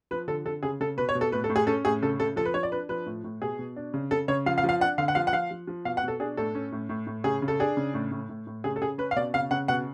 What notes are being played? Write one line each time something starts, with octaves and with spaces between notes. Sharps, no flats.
F3 B4
D3 A4
D3 A4
C#3 G#4
C#3 A4
B2 B4
C#5
B2
A4
A2 B4
A4
A2
G#4
C#4 A4
A2 G#4
C#3 A4
C#3 A4
F3 A4
B4
F3 C#5
D5
D4 B4
F3 B4
A2
A2
B2 G#4
B2
D4
C#3
C#3 A4
C#3 C#5
F3 F5
F5
F3
F5
D4 F#5
D3 F5
F#5
F3 F5
F#5
F3 F5
F3
F3
B2 F5
F#5
B2 A4
D4 G#4
A2 A4
C#4
A2
A2
A2
C#3 G#4
C#3
A4
D4 G#4
C#3
A2
A2
A2
A2
C#3 G#4
A4
C#3 G#4
C#4 B4
F5
B2 D5
C#3 F5
C#3 F#5
B2 F#5